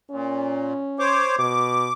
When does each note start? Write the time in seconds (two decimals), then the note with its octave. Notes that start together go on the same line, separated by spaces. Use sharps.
0.11 A#2 C#4
0.99 C5 C#5 D6
1.39 B2 D6